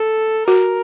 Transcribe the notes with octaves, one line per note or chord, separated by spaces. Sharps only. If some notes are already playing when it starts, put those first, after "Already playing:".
Already playing: A4
F#4 A#4